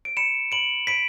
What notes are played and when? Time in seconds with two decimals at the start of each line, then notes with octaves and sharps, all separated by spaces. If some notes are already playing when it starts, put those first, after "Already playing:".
0.05 D7
0.17 B5 C#7 E7
0.52 B5 D7 F#7
0.87 B5 B6 D7